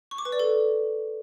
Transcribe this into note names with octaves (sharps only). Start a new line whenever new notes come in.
C#6
D6
B4
D5
A4